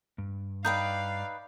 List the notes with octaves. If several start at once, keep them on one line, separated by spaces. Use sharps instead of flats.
G2
D#4 B4 D5 F5 G5 G6